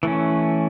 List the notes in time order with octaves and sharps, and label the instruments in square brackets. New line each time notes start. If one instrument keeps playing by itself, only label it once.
[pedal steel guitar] E3 A3 C#4